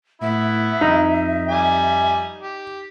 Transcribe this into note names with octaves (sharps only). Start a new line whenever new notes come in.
A2 B3 E4 E5
F2 D#4
G3 G#5
G4